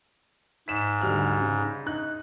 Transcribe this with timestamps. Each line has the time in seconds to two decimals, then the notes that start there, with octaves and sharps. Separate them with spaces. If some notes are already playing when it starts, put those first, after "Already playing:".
0.68 G#2 B6 E7
1.01 D2 G3 F6
1.42 C#3
1.86 D#4 F#6